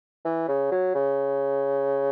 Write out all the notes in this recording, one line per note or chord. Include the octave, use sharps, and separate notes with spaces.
E3
C#3
F#3
C#3